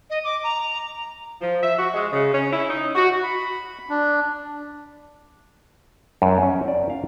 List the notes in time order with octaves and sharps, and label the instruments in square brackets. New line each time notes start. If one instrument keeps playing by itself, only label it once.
[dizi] D#5
D6
A#5
[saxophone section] F3
E5
F#4
G#3
C#3
C#4
E4
D#4
F#4
[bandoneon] B5
D4
[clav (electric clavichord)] F#2
C#4
D5
F5